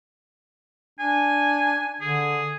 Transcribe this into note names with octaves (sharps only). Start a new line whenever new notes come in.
D4 G#5
D3 G#4